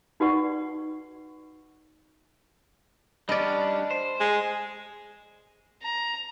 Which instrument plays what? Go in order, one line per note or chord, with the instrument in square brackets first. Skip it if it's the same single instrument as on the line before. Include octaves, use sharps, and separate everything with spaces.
[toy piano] D#4 F#4 B4 D5 F#5 C#6
[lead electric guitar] G3 C#4 [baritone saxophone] D4 [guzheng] D5 D#5
[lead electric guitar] C5
[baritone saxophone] G#3
[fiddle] A#5